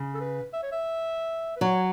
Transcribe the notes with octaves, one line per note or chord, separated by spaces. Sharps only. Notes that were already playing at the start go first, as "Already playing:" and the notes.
Already playing: C#3
A4
B4
E5
C#5
E5
B4
F#3 C#5